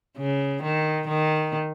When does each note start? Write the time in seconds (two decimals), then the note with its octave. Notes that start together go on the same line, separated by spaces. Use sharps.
0.18 C#3
0.63 D#3
1.08 D#3